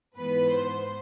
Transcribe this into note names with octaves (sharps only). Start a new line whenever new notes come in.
G#2 E3 B3 B4
C5